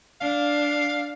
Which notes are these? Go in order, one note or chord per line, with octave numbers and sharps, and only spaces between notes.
D4 F5